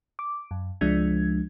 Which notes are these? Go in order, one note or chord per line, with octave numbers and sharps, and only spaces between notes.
D6
F#2
C#2 F3 G#3 D4 G#6